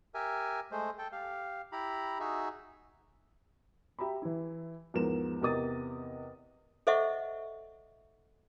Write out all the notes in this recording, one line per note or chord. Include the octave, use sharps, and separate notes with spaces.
G4 A#4 E5 G#5
G#3 A3 C5
A4 G5
G4 F5
E4 G4 A#5 B5
D#4 F#4 G#4 E5
G4 E5 A#5 B5
E3 E4
E2 G#2 F3 A#4 E7
E2 C3 A#4 D#5 D#6 A6
A4 C5 D#5 E5 F#5 C#6